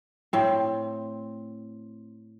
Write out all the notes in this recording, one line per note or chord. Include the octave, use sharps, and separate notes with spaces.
A2 C4